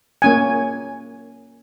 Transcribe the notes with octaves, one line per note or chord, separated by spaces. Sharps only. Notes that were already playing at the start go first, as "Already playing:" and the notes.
A#3 C#4 G#5